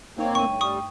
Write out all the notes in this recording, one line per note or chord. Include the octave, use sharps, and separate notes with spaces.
G1 A#3 C4 D#4 C#5
G2 A3 G5 C#6 D#7
G3 C#6 D#6